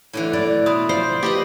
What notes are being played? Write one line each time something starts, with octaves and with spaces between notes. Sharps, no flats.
A2 D3 E3
E4 D5
B2 B5 C6 D#6
F3 C5 D5 C7
G4 B4 D#5 D6 A6